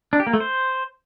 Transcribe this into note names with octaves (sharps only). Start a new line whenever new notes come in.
D4
G4
A#3
A3
C5